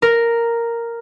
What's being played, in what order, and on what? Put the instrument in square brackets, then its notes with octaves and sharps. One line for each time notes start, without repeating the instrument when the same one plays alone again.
[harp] A#4